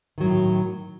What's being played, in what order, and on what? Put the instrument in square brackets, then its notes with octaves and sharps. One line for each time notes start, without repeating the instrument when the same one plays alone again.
[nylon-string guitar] D#3
F#3
A2